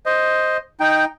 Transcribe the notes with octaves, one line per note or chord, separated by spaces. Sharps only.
C5 D#5
D#4 G5